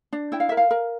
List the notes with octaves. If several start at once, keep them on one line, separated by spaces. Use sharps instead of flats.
D4
E4 G5
F5
A#4 E5
F5
A#4